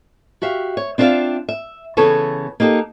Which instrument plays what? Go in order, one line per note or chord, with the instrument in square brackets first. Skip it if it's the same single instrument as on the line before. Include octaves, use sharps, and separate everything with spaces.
[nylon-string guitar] F#4 G4 E5 F5
C#5
C4 D4 F4 A#4 E5 F5
E5
C#3 E3 B3 A4 B4 C#5
A#3 D#4 G4 A4